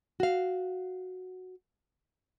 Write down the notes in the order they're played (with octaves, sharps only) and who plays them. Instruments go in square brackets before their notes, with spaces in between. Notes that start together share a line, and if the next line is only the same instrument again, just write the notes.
[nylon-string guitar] F#4 F5